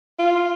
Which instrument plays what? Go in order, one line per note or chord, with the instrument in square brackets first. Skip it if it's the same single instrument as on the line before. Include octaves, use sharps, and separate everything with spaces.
[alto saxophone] F4